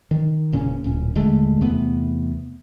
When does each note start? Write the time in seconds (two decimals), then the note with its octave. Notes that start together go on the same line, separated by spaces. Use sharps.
0.11 D#3
0.52 E1 A#2 C#3 C#4
0.84 D1 A#2 C#4
1.15 D#1 D3 G#3 A3
1.61 E2 C3 A3 B3